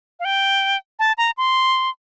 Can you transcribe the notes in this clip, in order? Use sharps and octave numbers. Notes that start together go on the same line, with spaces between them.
F5
G5
A5
A#5
C6